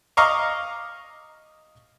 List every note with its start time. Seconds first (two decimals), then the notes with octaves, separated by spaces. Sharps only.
0.17 D#5 F5 A#5 C#6 D6